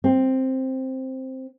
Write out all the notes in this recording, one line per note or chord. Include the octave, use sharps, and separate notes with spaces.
C4